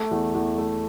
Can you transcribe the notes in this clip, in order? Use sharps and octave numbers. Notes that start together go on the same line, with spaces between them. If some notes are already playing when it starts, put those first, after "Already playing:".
Already playing: A3
E2
E2
A3